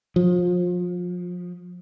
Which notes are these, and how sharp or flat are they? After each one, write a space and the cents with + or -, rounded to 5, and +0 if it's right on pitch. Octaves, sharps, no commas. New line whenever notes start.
F3 +30